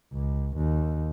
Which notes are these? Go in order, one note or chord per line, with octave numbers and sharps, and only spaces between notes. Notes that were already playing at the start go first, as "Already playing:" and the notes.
C#2
D#2